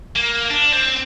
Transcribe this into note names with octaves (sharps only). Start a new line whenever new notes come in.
A#3
D4
C4